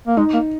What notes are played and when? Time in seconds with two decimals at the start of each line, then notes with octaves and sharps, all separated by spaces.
0.07 A#3
0.17 G#3 D#4
0.34 A#3